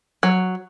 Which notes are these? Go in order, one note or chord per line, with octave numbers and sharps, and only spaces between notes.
F#3